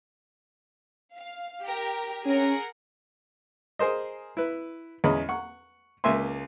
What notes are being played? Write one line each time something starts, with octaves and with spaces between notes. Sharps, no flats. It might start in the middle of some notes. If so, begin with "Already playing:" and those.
F5
G4 A#4
C#4 G#4 A#4 F#5
G#4 A#4 C5 D#5
E4 B4
E2 G#3 C#4 D#5 B5
F#5 C#6
C#2 A#3 E5 G#5 C6